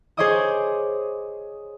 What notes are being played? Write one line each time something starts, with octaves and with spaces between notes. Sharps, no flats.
G#4 C5 C#5 D#5 D6 D#6